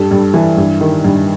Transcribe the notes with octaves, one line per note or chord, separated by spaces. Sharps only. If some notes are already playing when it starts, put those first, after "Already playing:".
Already playing: G2 G4 A4
G2
E3
G2
D#3
G2